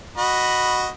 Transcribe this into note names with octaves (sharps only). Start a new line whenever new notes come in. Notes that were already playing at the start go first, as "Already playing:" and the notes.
F#4 D#5 B5